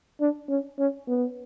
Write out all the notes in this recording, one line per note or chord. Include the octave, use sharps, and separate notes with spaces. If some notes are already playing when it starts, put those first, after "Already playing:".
D4
C#4
C#4
B3